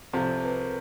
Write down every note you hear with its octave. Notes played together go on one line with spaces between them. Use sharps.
C2 C3 F3 A4
B4
A#4